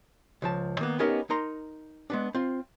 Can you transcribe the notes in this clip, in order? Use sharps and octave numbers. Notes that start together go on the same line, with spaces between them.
C#2 F3 A5
D#3 A#3 B3
B3 C#4 D#4 G4 A#4 D#5
D#4 A#4 A#5 C6
G#3 B3 D4
C4 F4